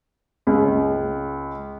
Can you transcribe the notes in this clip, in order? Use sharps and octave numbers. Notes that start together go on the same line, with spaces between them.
C#2